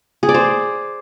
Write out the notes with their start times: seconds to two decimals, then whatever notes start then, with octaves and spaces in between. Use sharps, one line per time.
0.23 G#4
0.29 D5
0.35 C5